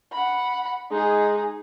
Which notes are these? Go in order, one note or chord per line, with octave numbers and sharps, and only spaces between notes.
F#5 B5
G#3 D#4 G#4